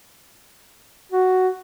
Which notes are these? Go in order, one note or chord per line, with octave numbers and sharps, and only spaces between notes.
F#4